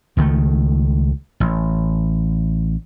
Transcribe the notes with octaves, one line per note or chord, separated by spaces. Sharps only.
C#2 D#3 E3 A3
A1